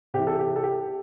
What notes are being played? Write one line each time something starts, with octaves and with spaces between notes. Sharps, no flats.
C3 E3 G4
A4
G4
A4
G4